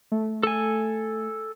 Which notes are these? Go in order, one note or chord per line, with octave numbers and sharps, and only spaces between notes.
A3
A4 G#5